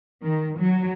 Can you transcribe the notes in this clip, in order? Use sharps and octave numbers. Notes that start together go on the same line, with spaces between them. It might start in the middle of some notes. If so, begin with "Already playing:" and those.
D#3
F#3